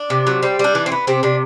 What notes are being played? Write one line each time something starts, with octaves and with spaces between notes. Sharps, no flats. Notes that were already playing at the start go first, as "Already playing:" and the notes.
Already playing: D4
C3
F#3
G3 C4
G3 D4
E3
C4
B3
C3 C4
C3 D4